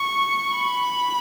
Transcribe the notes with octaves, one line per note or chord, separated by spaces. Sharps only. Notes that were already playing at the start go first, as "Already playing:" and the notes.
Already playing: C#6
B5